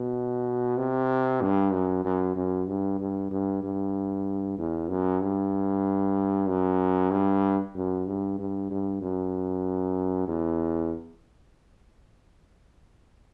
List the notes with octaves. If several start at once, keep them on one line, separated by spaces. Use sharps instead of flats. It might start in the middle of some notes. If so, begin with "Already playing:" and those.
Already playing: B2
C3
G2
F#2
F#2
F#2
G2
G2
G2
G2
E2
F#2
G2
F#2
G2
F#2
G2
G2
G2
F#2
E2